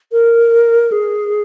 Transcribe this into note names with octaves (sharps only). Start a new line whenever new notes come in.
A#4
G#4